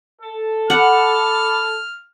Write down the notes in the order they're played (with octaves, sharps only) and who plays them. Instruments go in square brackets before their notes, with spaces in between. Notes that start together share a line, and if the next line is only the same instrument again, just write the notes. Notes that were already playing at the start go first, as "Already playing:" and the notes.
[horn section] A4
[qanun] F#5 [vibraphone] B5 D6 [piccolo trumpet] F6